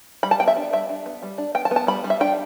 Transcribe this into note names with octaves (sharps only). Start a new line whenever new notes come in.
G3 B5
A5
B3 G5
E5
D4
G3 E5
D4
B3
G3
D4
B3 G5
A5
B3
A5
G3 B5
G3
E5
D4 G5